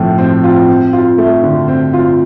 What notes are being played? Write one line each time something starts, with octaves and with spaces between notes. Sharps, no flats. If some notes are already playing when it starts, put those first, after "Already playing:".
Already playing: A2 F3 C4
C4
F4
C4
F4
A3
D3
C4
F4